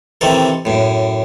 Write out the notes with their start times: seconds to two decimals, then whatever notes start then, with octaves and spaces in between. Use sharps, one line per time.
0.21 C3 D#3 E3 A4
0.65 F#2 A2